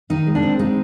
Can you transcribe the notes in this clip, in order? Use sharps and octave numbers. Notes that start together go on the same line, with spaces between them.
D#3 D#4
G#3
D4
C4
G#3 D#4